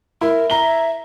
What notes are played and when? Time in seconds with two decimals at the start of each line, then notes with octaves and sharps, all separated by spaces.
0.21 E4 A#4
0.50 E5 A#5 G7